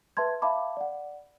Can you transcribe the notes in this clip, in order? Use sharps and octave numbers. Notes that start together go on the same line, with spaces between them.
B4 E5 A5 C6 G#6
E5 F5 A5 B5 D6
D5 F#5